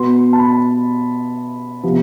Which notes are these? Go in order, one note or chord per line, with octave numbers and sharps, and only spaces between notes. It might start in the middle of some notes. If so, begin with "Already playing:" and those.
Already playing: B2 B3 C6
A5
B5
C3 F3 B3